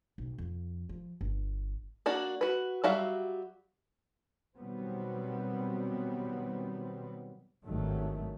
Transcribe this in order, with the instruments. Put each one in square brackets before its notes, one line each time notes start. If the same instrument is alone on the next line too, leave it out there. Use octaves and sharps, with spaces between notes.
[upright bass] B1
F2
F3
G1
[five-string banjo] A#3 D4 F#4
F#4 B4
F#3 G3 F#4 E5 F5
[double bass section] B2 D#3 F#3 G3 B3 C4
G#1 G2 D#3 F#3 A3